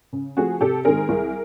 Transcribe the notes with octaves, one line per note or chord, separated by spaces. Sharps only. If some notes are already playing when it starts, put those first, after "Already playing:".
C#3
F3 A3 C4 F#4 G#4
C3 G4 A4
D#3 G#3 C4 G#4 A#4
C2